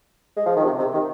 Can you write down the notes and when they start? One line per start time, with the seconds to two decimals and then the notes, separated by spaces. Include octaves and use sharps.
0.37 G#3
0.46 F3
0.56 D#3
0.64 C3
0.79 C3
0.94 D#3